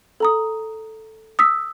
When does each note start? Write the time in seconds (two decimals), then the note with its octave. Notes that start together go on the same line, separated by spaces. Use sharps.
0.20 A4 A#5 D#6
1.39 D#6 E6 B6